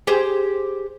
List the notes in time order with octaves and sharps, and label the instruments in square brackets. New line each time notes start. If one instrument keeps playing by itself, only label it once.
[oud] G4 G#4 C5